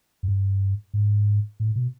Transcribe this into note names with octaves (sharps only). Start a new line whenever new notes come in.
F#2
G2
G#2
A2
B2